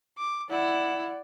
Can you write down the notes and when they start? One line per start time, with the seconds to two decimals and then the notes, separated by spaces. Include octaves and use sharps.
0.18 D6
0.50 E4 D5 F#5